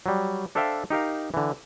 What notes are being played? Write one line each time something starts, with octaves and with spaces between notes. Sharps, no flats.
F#3 G3
D4 A4 C5 E5 F5 G5
D#4 G4 A#4 F5
D3 E3